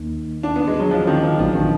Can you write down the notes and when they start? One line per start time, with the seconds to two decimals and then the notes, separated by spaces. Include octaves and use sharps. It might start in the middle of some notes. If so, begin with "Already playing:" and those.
Already playing: D#2 D#3 A#3 D#4
0.43 D4
0.56 B3
0.67 G#3
0.80 F#3
0.91 F3
1.07 D#3
1.23 F3
1.39 A#1 A#2 F3 F#3 B3 D4
1.55 D#3